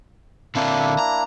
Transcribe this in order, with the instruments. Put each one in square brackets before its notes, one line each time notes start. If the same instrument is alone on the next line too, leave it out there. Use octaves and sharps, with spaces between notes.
[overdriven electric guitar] D3 C4 [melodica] A#3 D4 E4
[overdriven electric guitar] A#5